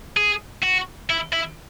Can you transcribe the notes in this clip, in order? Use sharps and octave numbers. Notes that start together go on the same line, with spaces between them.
G#4
F#4
E4
E4